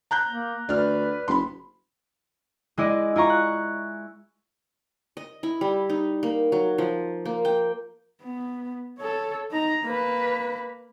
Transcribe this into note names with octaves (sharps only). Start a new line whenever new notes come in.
A#5 F#6 G6
A#3
D2 B4 D5 F6
F#1 B5 C6
G#3 E4 D5 D#5
E4 F4 A#5 C#6
F#6
D#5
E4
G3
D#4
A#3
F#3
F3
A#3
G5
B3
A4 C#5
D#4 A#5
A#3 B4